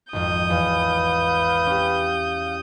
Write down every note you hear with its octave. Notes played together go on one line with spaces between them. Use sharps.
G#1 F2 D#6 G6
E2 B4 F5
C#4 G4